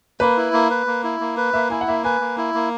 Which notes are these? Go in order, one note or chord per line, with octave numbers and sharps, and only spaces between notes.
A#3 B4
E4
A#3
B4
A#3
E4
A#3
B4
A#3 E5
E4 G#5
F#5
A#3 E5
B4 G#5
A#3
E4
A#3